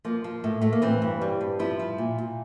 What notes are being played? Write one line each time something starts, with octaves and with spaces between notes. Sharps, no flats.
F3 A#3
F3
A2
A2 A3
A#3
E3 C4
G2
G3
G2
F3 E4
F3
A#2
A#2